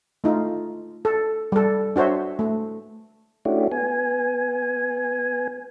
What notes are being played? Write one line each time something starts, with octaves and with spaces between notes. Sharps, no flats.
A3 D#4 F4
A4
G3 A4
D4 F#4 C5 C#5 E5
A3
A3 C#4 D4 E4 F#4 G4
B3 G#5